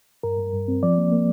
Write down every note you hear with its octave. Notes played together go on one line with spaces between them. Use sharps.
G2 A#4
G2
G2
C4
F3 D5
A#3
A#3